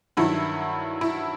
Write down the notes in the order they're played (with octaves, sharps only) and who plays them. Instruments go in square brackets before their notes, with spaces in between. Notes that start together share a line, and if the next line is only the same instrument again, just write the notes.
[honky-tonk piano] G2 D#3 F#3 E4
E4